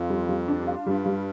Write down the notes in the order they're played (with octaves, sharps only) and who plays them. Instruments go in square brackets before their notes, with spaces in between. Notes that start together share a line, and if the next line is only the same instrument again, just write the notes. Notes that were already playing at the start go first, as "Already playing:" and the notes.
Already playing: [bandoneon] F2 [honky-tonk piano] F4
[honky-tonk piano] G3
G3
D4
F4
[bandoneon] G2 [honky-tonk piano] G3
[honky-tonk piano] G3